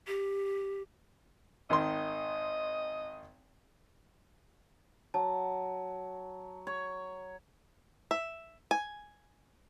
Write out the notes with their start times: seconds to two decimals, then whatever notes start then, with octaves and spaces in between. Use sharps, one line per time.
0.07 G4
1.70 G#1 D#3 D#5 C6
5.14 F#3 A5
6.67 C#5
8.11 E5
8.71 G#5